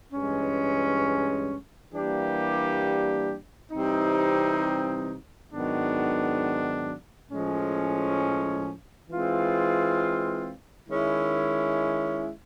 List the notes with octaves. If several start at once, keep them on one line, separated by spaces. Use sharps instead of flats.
G2 E3 G#3 C#4
E3 G3 A#3 D4 G4
C3 E3 G3 C4 D#4
G#2 D#3 F#3 B3 D4
A2 F3 G#3 C#4
E3 G#3 C4 F4
D#3 G#3 C#4 E4